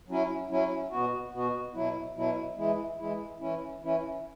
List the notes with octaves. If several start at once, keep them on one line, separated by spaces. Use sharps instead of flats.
F#3 C#4 E4
F#3 C#4 E4
B2 B3 F#4
B2 B3 F#4
B2 F#3 E4
B2 F#3 E4
E3 G#3 E4
E3 G#3 E4
E3 C#4 E4
E3 C#4 E4